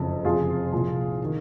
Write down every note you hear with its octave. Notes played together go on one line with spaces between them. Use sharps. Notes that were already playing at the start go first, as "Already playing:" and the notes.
Already playing: F#1 F2 C#3
F2 C3 F3 F4 G#4
C2 A#2 F3
D#3